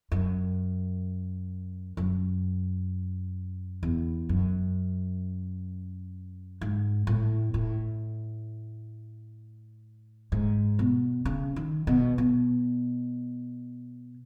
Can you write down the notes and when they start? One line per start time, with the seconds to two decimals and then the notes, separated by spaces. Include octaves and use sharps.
0.12 F#2
1.97 F#2
3.83 E2
4.29 F#2
6.61 G#2
7.07 A2
7.54 A2
10.32 G#2
10.79 B2
11.25 C#3
11.56 D#3
11.87 B2
12.18 B2